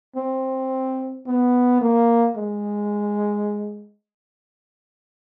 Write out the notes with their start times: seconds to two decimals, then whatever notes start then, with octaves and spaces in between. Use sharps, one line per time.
0.16 C4
1.27 B3
1.81 A#3
2.36 G#3